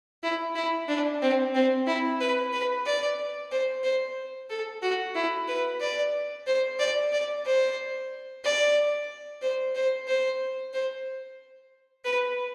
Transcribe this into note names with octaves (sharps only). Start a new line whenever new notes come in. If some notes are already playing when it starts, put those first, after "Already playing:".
E4
E4
D4
C4
C4
E4
B4
B4
D5
C5
C5
A4
F#4
E4
B4
D5
C5
D5
D5
C5
D5
C5
C5
C5
C5
B4